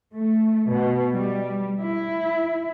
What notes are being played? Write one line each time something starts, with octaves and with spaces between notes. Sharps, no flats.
A3
B2
G3
E4